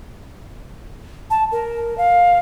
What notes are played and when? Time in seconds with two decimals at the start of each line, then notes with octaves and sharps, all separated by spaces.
1.30 A5
1.52 A#4
1.98 F5